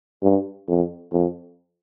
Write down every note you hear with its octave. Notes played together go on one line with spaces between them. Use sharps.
G2
F2
F2